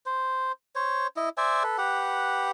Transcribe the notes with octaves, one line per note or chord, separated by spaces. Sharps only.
C5
C5 C#5
E4 D#5
C5 D5 E5 G#5
A4 B4
G4 B4 F#5